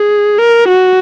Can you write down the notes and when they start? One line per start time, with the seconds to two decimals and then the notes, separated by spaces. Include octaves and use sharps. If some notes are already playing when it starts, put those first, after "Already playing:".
Already playing: G#4
0.39 A#4
0.68 F#4